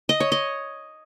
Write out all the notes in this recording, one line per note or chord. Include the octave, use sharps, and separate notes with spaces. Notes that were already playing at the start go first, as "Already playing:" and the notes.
D#5
C#5
D#5